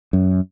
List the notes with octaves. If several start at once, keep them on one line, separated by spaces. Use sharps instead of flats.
F#2